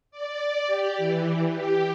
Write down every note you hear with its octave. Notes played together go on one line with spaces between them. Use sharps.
D5
G4
E3
G4